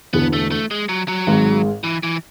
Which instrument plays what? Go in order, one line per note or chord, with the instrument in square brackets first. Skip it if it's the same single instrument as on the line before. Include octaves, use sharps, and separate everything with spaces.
[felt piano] E1 E2 D3 [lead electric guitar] B3
[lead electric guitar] A3
A3
G#3
F#3
F#3
[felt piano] G#1 G#2 G#3
[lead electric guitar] E3
E3